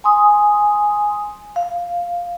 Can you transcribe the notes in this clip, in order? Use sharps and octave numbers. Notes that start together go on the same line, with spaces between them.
G#5 C6 D#6
F5